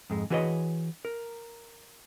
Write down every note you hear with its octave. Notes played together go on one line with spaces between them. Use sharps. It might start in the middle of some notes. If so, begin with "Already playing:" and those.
F2 G#2 G#3
E3 F#4 G#4 B4 C#5 D#5
A#4